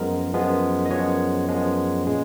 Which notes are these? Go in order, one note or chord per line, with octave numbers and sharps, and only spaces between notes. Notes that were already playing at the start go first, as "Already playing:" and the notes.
Already playing: F#2 F3 G#3 B3 A#4
F#2 F3 G#3 B3
D#5
F#2 F3 G#3 B3 C#5
F#2 F3 G#3 B3
A#2 G#3 C#4